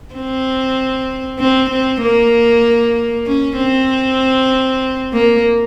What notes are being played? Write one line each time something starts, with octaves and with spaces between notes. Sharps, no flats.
C4
C4
C4
A#3
C#4
C4
A#3